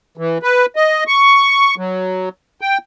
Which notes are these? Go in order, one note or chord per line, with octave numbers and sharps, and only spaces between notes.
E3
B4
D#5
C#6
F#3
G5